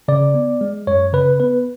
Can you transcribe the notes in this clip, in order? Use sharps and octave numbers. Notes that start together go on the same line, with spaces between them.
C#3 D5
B3
G#3
F#2 C#5
C#3 B4
B3 B4